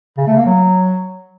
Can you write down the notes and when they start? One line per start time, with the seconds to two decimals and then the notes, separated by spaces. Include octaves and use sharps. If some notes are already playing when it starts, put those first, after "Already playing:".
0.18 C#3
0.27 A3
0.36 A#3
0.46 F#3